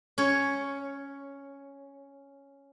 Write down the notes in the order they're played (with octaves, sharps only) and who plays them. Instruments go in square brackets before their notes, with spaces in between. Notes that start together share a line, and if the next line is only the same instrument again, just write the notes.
[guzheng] C#4 C#5